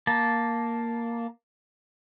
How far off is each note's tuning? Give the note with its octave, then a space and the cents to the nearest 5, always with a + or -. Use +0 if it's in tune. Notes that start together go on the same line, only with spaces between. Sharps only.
A#3 +0 A5 +0